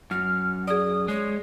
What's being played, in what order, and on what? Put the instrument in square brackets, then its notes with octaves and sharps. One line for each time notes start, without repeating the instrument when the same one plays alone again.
[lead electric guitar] F#2 [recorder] F6
[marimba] G#4 D5 [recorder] D#6
[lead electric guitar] G#3 [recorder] C#5